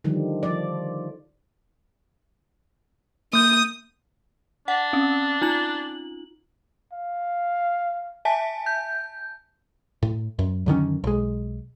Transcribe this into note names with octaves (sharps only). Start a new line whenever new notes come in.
D3 D#3 F3 G3
F3 D5
A#3 D#6 G6
D4 F#5
C4 C#4
D#4 F4 F#7
F5
E5 G#5 A5 B6
G6
A2
F#2
F#2 D3 D#3 C#4
B1 G#3